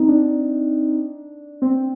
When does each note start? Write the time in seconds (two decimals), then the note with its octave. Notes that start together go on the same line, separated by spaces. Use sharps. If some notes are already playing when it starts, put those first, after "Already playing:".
Already playing: C4 D#4
0.08 D4
1.62 C4